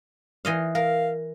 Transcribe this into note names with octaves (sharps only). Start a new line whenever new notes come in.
E3 D#5 F5
A#4 F5